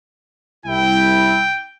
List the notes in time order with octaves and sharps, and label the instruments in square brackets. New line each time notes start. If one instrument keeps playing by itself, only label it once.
[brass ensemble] C2 E4 [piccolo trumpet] G5